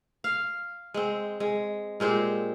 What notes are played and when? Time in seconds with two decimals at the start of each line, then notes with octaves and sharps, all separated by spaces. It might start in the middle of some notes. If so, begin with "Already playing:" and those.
0.24 F5
0.94 G#3 C4
1.40 G#3
2.00 A#2 G#3 C4 G4